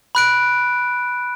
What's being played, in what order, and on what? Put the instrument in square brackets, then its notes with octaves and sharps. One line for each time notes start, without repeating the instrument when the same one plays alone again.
[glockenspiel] B5 F#6 D7